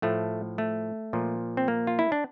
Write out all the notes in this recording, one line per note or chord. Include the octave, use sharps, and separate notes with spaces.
A2 F3 A3
A3
A#2 F3
C4
A#3
F4
E4
D4